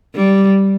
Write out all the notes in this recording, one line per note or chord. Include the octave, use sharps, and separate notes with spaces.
G3